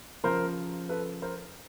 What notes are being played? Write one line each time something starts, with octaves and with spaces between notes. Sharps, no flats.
C#3 F3 A#4 C5
A4 B4
A#4 C5